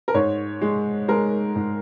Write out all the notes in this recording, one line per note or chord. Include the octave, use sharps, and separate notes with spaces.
A#4
G#2 C#5
G#3
G#3 A#4
G#2